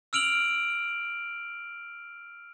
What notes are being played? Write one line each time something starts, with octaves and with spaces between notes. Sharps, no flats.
E6 F6 D7 F7 F#7